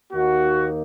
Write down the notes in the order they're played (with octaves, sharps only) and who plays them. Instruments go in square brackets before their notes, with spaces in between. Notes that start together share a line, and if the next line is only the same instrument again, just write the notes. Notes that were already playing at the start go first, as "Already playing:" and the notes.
[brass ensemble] D#2 D#3 A#3 D#4 F#4